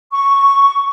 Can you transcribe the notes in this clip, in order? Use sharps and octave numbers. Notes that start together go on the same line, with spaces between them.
C#6